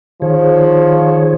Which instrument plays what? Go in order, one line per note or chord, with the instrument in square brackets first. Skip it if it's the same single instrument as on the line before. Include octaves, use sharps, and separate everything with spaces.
[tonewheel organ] D#3 G#4 C#5 [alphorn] F3